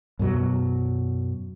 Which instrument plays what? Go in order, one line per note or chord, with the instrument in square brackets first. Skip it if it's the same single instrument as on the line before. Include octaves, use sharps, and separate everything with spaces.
[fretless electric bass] F#2 B2 F#3